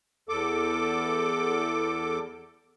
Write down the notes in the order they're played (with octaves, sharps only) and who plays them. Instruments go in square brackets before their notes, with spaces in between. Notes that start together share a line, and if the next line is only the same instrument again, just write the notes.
[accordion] E2 A4 D6